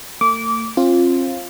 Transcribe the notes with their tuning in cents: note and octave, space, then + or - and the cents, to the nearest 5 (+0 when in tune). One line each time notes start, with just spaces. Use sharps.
A3 +45 D6 -20
C4 +40 F4 +0